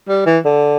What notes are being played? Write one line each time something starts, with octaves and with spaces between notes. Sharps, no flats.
G3
E3
D3